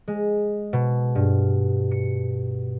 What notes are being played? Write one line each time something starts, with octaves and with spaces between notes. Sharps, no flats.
G#3
B2
G2
C#7